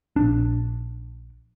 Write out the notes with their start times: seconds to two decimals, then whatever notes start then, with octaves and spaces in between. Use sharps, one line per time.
0.16 A#1 D4